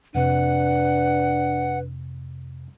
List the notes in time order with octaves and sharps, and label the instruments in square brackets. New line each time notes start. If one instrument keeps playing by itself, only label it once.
[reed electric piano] F2 C3 [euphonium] D4 [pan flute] B4 [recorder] F#5